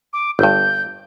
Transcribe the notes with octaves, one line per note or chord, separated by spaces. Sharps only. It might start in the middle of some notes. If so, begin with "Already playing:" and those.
D6
G1 G2 G6